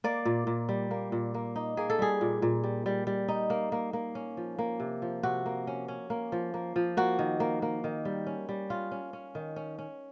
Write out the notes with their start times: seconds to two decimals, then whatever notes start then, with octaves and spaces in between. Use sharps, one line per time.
0.04 A#3 D5
0.25 A#2
0.47 A#2
0.69 G3
0.91 A#3
1.12 A#2
1.34 A#3
1.56 D#4
1.77 A#3 G#4
1.90 A4
1.99 G3 G#4
2.21 A#2
2.42 A#2
2.64 G3
2.86 G3
3.07 G3
3.28 D#4
3.50 A#3
3.72 A#3
3.93 A#3
4.15 C#4
4.37 F3
4.59 A#3
4.80 C3
5.02 F3
5.23 C3 F#4
5.46 A#3
5.67 C#4
5.88 C#4
6.10 A#3
6.32 F3
6.54 A#3
6.76 F3
6.97 A#3 F#4
7.19 D#3
7.40 A#3
7.62 A#3
7.84 D#3
8.05 G3
8.26 C#4
8.49 G3
8.70 C#4 F4
8.91 C#4
9.13 C#4
9.35 D#3
9.56 C#4
9.78 C#4